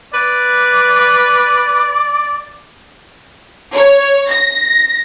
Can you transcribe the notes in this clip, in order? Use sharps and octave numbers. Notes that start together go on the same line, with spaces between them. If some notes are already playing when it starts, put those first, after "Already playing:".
B4 D5
C#5
A#6